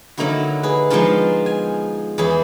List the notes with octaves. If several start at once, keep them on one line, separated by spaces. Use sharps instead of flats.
D3 F#3 A#3 D#4 E4 F#4
G#4 B4
F3 G#3 B3 D4 D#4 F4
G#5
E2 F#3 G#4 B4